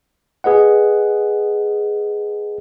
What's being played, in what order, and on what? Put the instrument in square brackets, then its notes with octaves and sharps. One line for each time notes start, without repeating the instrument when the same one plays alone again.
[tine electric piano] G#4 B4 D#5 F#5